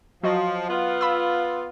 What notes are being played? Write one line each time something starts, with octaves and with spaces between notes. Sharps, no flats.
F3 F#3 F#4 D#5
B3 F4
B5 E6